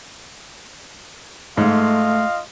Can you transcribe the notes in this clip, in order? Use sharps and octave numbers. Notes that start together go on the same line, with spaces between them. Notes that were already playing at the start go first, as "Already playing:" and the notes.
G#2 A3 F4 D#5 F5